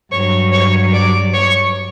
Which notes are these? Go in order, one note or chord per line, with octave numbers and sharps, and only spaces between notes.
G2 F#3 C#5 C#6
C#5 C#6
D5 D6
C#5 C#6